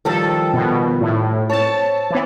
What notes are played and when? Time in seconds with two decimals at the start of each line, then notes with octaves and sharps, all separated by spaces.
0.05 D#3 F3 G3 A4
0.54 B2
1.00 A2
1.49 C4 C#5 A5
2.10 E3 B3